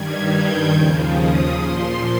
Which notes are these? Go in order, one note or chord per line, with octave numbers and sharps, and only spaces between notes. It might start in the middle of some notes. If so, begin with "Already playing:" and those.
Already playing: G2 D#3 G3 G#6
G6
D#2 C#3 F3
D#6
A#2 F3 C6